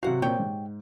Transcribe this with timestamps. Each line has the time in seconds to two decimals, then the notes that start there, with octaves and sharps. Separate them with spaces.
0.03 C3 F#3 F#4 F5 F#5
0.22 A#2 C4 G4 C#5 G5
0.39 G#2